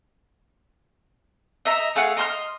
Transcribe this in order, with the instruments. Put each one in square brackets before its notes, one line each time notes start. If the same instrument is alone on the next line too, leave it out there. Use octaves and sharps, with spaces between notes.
[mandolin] D#5 E5 A#5
A3 G#4 F5 F#5
D#5 C6 E6 F6